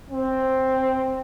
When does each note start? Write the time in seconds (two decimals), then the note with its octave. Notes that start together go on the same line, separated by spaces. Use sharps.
0.11 C4